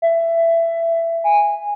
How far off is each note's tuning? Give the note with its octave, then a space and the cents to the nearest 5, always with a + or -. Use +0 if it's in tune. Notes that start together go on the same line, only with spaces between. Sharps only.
E5 +20
G#5 -15